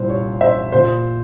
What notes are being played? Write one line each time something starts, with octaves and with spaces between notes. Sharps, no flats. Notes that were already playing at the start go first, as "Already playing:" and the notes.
Already playing: C2 A#2 G3 C5
C#5
C5 E5
A#2 C5